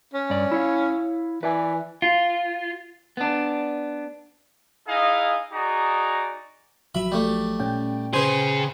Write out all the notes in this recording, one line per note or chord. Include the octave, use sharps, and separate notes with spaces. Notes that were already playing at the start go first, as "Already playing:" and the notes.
C#4
G2 D5
E4 C#5 F5
E3 B4 D5 G#5
F4
B3 D4
D#4 E4 G#4 D#5 F5
D#4 F#4 G#4 D5 A#5
A1 F3 F#3 E5 B5
G3 A3
A#2 C#4 G5
C#3 G#4 B4 C5